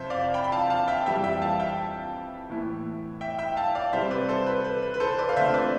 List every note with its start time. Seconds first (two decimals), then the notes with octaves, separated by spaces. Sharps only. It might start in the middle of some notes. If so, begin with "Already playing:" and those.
Already playing: F2 C3 F3 C5 E5
0.10 D5 F5
0.34 G5 B5
0.44 B5
0.52 F5 A5
0.70 F5 A5
0.88 E5 G5
1.06 F2 E3 G3 E5 G5
1.24 E5 G5
1.41 F5 A5
1.59 E5 G5
2.50 A2 E3 B3 E4
3.21 E5 G5
3.38 E5 G5
3.56 F5 A5
3.75 D5 F5
3.93 C3 G3 C4 C5 E5
4.11 B4 D5
4.29 A4 C5
4.47 B4
4.64 B4
4.82 B4
4.94 B4
5.00 A4 C5
5.18 B4 D5
5.29 F5
5.36 D3 A3 C4 F4 C5 E5
5.54 B4 D5